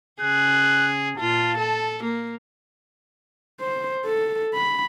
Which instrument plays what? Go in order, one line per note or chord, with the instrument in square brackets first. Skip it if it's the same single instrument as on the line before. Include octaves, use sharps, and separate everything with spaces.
[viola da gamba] C#3 G#4 [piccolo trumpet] F#6
[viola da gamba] A#2 F4 [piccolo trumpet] A5
[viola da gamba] A4
A#3
[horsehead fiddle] C5
A4
B5